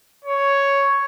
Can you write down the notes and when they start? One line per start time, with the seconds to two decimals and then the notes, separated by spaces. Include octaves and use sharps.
0.24 C#5